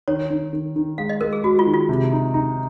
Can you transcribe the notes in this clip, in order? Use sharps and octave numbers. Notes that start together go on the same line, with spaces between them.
D#3 C#5
D#3
D#3
D#3
G#3 F5
D#5
G#3 A#4
G#4
G#3 F#4
F4
D#3
F4
C3
D#4
D#4